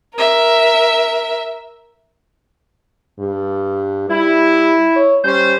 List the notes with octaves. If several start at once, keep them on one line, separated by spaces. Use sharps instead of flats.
A#4 E5
G2
G3 E4
C#5
G3 C#4 C5